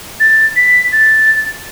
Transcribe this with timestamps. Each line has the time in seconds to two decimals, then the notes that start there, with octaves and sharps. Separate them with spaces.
0.20 A6
0.56 B6
0.93 A6